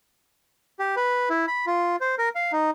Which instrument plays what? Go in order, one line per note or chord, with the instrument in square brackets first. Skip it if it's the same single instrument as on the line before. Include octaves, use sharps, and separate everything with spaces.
[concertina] G4
B4
E4
B5
F4
C5
A#4
F5
D#4